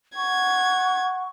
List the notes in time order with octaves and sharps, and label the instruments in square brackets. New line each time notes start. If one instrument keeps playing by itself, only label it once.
[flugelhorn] F#5 [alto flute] C#6 [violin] G#6